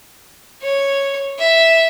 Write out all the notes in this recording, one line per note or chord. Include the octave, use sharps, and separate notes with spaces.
C#5
E5